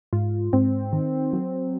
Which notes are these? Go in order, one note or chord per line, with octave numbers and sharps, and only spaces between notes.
G#2 F4
G#2 C4
D#3
F#3